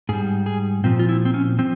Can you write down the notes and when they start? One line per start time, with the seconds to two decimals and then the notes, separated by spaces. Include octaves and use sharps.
0.09 G#2 G3 G#4
0.46 G#4
0.84 A#2 F3 C4
0.99 F4
1.09 E4
1.25 C4
1.34 C#4
1.59 F3 C4